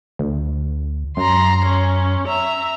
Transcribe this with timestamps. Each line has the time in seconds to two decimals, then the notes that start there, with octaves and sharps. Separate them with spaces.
0.19 D2
1.17 F#2 A#5 C6
1.65 C#4
2.27 E5 A#5